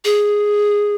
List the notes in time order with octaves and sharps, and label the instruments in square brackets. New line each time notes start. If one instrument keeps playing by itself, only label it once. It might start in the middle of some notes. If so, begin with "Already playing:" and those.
[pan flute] G#4